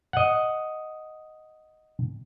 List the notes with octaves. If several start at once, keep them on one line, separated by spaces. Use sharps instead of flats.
D#5 F#5